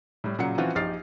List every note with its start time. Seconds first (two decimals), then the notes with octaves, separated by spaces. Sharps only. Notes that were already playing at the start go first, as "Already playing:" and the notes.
0.24 A2 G3
0.39 A#2 C#3 F#3 F#5 C#7
0.58 E3 F3 C4 C#4 F4 F#4
0.75 A#1 D#4 G4 F6 A6 C7